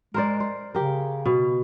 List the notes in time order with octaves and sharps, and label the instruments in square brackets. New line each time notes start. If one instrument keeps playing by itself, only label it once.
[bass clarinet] G#3 [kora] A#4 C5 D5
[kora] C5
[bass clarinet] C#3 [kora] G4 A#4
[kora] B2